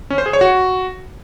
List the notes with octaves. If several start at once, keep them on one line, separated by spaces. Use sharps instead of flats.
C#4
C5
G#4
C#5
F#4